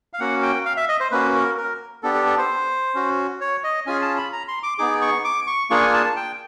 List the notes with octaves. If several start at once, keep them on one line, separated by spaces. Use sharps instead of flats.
F5
A#3 C#4 F#4 F#5
G5
F5
E5
D#5
C5
A#3 C#4 F#4 B4
A#4
A#4
B3 D4 G4 A4
A4
A4
C5
C#4 F#4
C#5
D#5
C#4 F4 G#4 G#5
A5
B5
A#5
C6
D6
B3 D#4 G#4 D6
C#6
D6
C#6
A#3 D4 F4 G#4 C#6
G#5
A5
G5